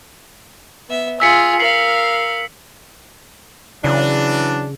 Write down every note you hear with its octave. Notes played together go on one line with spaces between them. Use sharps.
B3 E5
F4 G#4 E6 B6 C#7
A#4 F5 C7 F#7
C#3 E3 F#3 D4